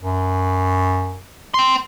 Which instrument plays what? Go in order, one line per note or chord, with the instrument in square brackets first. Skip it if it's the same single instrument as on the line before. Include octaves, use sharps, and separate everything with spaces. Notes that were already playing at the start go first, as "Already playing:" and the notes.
[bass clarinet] F#2
[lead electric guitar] G5 C6